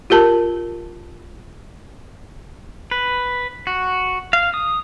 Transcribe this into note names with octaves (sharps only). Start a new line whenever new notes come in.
F4 G4 A#4 A5
B4
F#4
F5
D#6